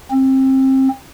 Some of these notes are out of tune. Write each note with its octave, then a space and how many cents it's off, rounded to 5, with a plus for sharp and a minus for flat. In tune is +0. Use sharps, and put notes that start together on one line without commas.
C4 +25